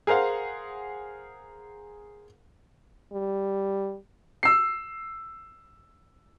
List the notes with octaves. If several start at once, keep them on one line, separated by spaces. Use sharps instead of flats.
G#4 A#4 C5 F5 F#5
G3
E6 C7